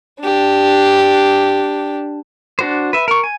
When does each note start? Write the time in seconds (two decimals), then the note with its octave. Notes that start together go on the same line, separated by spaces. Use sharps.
0.20 D4 G4
2.59 D4 F#4 C5
2.93 B4 E5
3.08 A#4 C#6
3.24 G#5